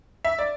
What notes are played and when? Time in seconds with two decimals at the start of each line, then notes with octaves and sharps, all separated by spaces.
0.25 E5
0.39 D5